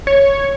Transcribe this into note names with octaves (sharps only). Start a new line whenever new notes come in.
C#5